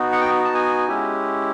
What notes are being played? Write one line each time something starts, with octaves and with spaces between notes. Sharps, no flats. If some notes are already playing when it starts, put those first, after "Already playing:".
Already playing: B3 D#4 F#4
F#5
G5
A5
G#5
G#3 C#4 E4 G4